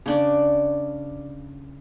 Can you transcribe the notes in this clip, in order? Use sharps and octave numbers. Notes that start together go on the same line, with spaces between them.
C#3 D4 D5